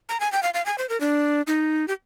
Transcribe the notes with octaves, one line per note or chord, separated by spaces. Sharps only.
A#5
G#5
G5
F5
F5
G#5
C5
A#4
D4
D#4
G4